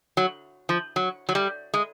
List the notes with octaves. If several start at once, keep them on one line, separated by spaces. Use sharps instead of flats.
F#3
F3
F#3
F#3
G3
G#3